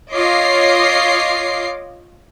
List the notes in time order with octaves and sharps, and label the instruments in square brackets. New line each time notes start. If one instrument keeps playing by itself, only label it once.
[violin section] F4 C#5 D#5 D6 C7